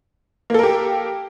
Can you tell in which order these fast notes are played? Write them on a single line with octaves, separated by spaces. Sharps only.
A#3 A4 A#4 G4